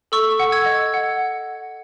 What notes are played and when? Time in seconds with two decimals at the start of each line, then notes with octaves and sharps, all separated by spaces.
0.12 A4 C#6 E6
0.39 F#5
0.52 E6 G#6
0.66 D#5
0.94 F#5